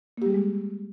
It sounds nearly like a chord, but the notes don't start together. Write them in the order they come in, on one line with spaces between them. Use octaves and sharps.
A#3 G4 G3 G#4 G#3